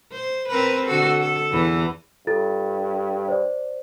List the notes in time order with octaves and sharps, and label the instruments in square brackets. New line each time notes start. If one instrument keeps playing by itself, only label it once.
[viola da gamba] C5
C4 A#4 B4
D3 F#4 A4
A4
E2 E3
[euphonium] G2 [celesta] F4 A4 A6
[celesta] C5 D5